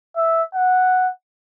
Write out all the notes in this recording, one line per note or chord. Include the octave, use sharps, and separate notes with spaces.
E5
F#5